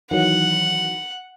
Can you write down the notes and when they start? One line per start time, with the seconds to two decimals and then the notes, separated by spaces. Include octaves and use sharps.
0.11 D#3 E3 F#3 F#5